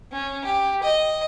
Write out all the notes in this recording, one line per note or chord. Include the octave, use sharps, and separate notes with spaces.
C#4
G4
D#5